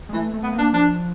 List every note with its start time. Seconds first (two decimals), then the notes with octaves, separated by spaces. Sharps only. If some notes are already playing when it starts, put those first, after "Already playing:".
0.09 G#3
0.13 E3 A3
0.34 A3
0.43 B3
0.53 A#3
0.58 D4
0.73 F3 D4